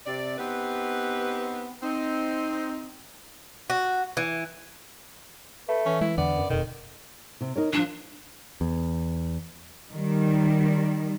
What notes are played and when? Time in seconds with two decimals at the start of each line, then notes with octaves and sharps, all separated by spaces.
0.05 C3 D5
0.38 B3 C4 D#4 G4 B4
1.82 C4 D#4
3.70 F#4
4.17 E3
5.68 A3 B4
5.86 E3 C#4
6.01 G#3 E4
6.17 E2 D3 B3 D4 D5
6.36 F#2
6.50 E1 F2 B2 D#3
7.41 C3
7.56 D#4 A#4 C#5
7.73 E3 F3 D4
8.61 E2
9.92 D#3 G3